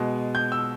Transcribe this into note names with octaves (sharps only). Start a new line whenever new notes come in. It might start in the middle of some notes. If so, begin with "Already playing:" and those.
Already playing: B2 G#3
G6
E6